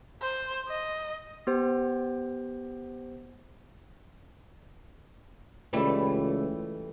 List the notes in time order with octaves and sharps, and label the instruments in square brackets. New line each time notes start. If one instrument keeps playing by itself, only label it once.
[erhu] C5
D#5
[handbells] B3 G4 C5
[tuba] C#2 [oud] E3 G3 A3